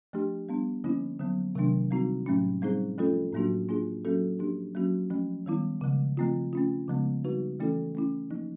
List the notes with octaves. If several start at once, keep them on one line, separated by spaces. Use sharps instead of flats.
F3 A3 D4 G4
G3 B3 D4
D3 F3 A#3 C#4 E4
D3 F#3 B3
C3 D#3 F#3 A3 D4
G3 C4 D#4 F#4
A2 F#3 A3 C#4
G3 C4 D#4 G#4 C5
F3 A3 C#4 F4 A4
A2 F#3 A#3 D4 F#4
A#3 D4 F4 G#4
F#3 A#3 C#4 F#4 A4
F3 A#3 D4 G4
F#3 A#3 C#4 F#4
F3 A3 C#4
D#3 G3 B3 E4
C#3 F3 G#3
F3 A3 C4 F4
A3 C#4 F4
C#3 F3 G#3 B3
G3 C4 D#4 F#4 B4
E3 A3 C#4 E4 A4
A3 C#4 E4
F3 A#3 D#4